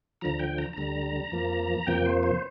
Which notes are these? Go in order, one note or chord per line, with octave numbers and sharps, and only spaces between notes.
D2 D3 F3 A#5
G5
A#5
D2 D3 G3 A#5
F2 F3 A#3
F2 C3 F3 A#3 G5
C5
C5